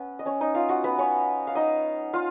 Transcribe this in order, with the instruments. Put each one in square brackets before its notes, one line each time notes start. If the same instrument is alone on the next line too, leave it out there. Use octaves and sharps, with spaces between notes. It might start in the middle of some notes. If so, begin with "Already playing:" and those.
Already playing: [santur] B3 C#4 B4
D#5
C#4 C#5
D#4 D#5
F4 F5
F#4 F#5
B3 B4
C#4 C#5
F5
D#4 D#5
F4 F5